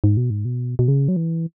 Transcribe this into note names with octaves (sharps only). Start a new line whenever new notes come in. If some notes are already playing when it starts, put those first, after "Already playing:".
G#2
B2
G#2
B2
B2
C#3
F#3
E3